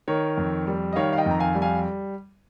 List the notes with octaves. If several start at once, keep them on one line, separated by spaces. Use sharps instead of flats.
D#3 A#4 C#5
F2
G3
D#5
D#3 C#5 F5
F5
D#5 G5
F2 A#5
F5 G#5
G3
F5 G#5